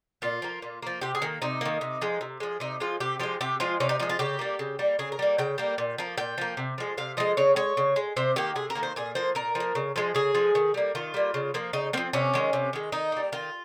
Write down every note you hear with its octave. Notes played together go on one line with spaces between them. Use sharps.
A#2 F4
F3 A#3
A#2
F3 A#3
C3 G4
G#4
D#3 A#3
C3 D#4
D#3 A#3
C3
F3 G#3
C3
F3 G#3
C3 D#4
F3 G#3 F4
C3 G4
F3 G#3 G4
C3 G4
F3 G#3 F4
C3 C#4
D#4
F3 G#3 D#4
F4
C#3 G4
G3 A#3
C#3
G3 A#3
C#3 G#4
A#4
G3 A#3
C#3 G5
G3 A#3
A#2
F3 A#3
A#2 G5
F3 A#3
C3
F3 G#3
C3 F5
F3 G#3 D#5
C#3 C#5
G#3 C#5
C#3
G#3
C3 C5
D#3 A#3 G4
C3 G#4
A#4
D#3 A#3
C5
A#2 G#4
F3 A#3 C5
A#2 A#4
F3
A#3
C#3
F3 G#3
C#3 G#4
F3 G#3
D#3
G3 A#3
D#3 F4
G3 A#3
C#3
F3 A#3
C#3 D#4
F3 A#3 C4
C3 C#4
D#3 G#3
C3
D#3 G#3
D#3 D#4
G3 A#3
D#3 F4